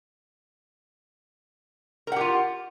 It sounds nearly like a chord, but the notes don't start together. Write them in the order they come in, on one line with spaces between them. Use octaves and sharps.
A#4 F#5 G4 F4